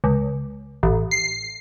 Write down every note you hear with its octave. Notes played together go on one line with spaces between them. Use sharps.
C#2
A1
C7